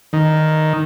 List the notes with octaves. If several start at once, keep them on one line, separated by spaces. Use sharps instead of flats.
D#3